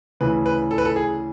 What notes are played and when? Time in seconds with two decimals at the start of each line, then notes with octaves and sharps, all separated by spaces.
0.20 D2 C#3 E3 B4
0.46 B4
0.71 A4
0.78 B4
0.85 A4
0.96 G#4